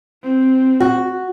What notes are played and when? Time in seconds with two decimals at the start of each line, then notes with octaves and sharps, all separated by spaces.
0.23 C4
0.80 F#4